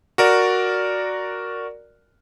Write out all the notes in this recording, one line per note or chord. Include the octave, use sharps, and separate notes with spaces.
F#4 A#4 D5